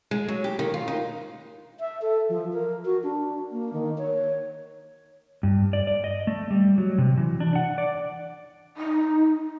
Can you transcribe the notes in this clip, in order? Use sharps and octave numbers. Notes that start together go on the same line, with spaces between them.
G#3
F#3
G4
D#3
F4
D#4
E5
A4
F3
A#4
F#4
D4
A#3
D#3
C#5
G2
D5
D5
D#5
A3
G3
F#3
C3
E3
D4
F#5
D5
D#4